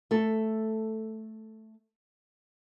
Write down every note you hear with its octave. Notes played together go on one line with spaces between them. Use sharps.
A3 A4